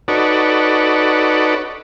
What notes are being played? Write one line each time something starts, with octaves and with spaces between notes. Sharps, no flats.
D#4 F#4 A4 B4 C#5 D5